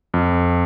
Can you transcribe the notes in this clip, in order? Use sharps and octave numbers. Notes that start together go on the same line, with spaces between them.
F2